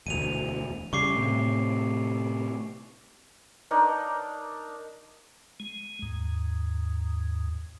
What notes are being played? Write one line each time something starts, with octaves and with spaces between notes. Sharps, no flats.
E1 D2 D#7 F7
C#3 G3 C#6 D6 C7
A2 C3
D4 D#4 A#4 C#5
G#3
D#2 G#2